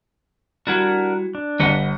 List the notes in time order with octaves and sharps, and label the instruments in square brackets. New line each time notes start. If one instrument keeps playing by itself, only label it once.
[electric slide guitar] G3 E4 F#4 [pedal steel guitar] D4 A#4 F#5
[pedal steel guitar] D4
[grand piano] G1 [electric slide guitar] B4 D#5 F#5